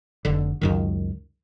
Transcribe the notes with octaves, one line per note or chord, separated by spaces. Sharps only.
F1 D3
C#2 F#2 D#3